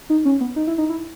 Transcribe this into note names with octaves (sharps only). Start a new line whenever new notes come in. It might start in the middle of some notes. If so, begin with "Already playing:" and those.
D#4
C#4
B3
D#4
E4
D#4
E4